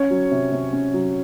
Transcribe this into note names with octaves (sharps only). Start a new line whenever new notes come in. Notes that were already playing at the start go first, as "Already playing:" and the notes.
Already playing: C#4 C#5
F#3
C3
C3
C#4
F#3